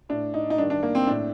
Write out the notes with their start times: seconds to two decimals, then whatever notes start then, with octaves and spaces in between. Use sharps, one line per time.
0.09 A2 D4
0.34 D#4
0.50 D#4
0.58 G2 D#3 D4
0.70 D4
0.83 A#3
0.95 C4
1.07 A2 D4